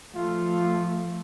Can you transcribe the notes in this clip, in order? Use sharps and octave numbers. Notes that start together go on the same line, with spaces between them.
F3 A3 F4